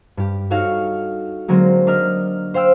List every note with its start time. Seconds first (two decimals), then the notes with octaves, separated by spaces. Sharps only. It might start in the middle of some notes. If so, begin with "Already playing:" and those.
0.17 G2 G4
0.50 D#4 F#4 A4 C#5 F5
1.48 D3 F#3 G#3 A#3 C4
1.87 D4 A#4 D#5 F6
2.54 C5 F5 G5 E6